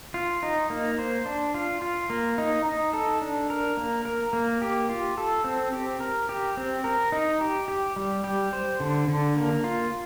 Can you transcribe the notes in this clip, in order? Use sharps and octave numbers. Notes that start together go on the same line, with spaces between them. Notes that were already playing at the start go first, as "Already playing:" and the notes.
F4
D#4
A#3
C5
D4
F4
F4
A#3
D#4
D#4
A4
D4
A#4
A#3
A#4
A#3
G4
F4
A4
C4
G4
A#4
G4
C4
A#4
D#4
G4
G4
G3
G4
C5
D3
D3
A#3
F4